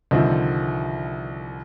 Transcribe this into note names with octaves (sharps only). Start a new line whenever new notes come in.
C2 D3 D#3 F3